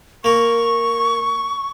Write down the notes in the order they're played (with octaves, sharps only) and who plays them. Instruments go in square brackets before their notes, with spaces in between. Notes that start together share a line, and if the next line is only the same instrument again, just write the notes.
[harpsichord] A#3 A#4 [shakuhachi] C#6